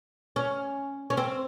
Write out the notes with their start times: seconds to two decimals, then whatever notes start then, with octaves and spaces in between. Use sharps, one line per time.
0.36 C#4
1.10 C#4
1.17 C4